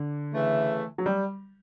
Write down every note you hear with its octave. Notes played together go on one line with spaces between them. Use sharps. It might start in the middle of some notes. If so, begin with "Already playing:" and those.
Already playing: D3
C#3 E3 A3
F#3
G3